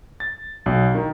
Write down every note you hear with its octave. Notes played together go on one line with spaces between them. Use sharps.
A6
B1
D#3